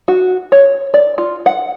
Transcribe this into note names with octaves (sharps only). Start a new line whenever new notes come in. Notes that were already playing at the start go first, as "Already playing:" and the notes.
F#4
C#5
D5
F4
F#5